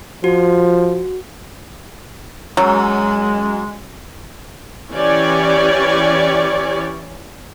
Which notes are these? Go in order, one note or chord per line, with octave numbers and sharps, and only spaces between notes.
F3 F#4
F#2 F#3 G#3
E3 C#4 G4 C#5 D5